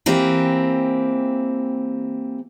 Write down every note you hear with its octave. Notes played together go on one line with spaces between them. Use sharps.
E3 A#3 C4 G4